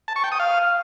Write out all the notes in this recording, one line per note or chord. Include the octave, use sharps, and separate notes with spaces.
A5
C#6
G5
D#6
F5